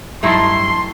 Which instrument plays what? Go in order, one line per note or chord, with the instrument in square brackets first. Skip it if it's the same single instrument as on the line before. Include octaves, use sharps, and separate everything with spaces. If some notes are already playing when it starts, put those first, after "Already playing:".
[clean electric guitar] G2 F#3 A5 [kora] A3 D#4 E4 [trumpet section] C6